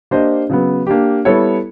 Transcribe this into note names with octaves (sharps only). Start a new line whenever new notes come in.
A#3 D4 G4 C5 D#5
C#3 F#3 B3
A#3 D4 G4
G3 B3 E4 A4 C#5